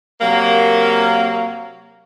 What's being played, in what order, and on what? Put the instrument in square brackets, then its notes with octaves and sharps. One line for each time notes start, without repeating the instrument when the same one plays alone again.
[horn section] C3 F#3 A#3